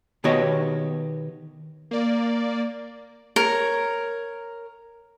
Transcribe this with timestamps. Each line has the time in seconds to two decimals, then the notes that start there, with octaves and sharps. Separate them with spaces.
0.24 B2 D#3 B3 G4 C#5 D#5
1.91 A#3 D5
3.36 A#4 C#5